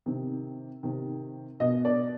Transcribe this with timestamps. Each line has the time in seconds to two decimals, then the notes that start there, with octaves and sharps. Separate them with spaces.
0.06 C3 D#3
0.83 C3 D#3
1.60 B2 D#5
1.85 D5